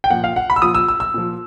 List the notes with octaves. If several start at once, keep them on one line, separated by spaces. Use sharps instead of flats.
G5
A#2 F3 F#5
F5
F#5
B5
E6
A#2 F3 D#6
E6
E6
E6
A#2 F3